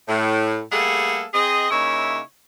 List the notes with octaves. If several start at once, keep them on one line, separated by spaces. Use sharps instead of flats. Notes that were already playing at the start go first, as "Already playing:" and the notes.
A2
G3 A3 A#3 G#4 A4 F#5
C4 G#4 D#5
C#3 A#3 D#4 E4 C#5 E5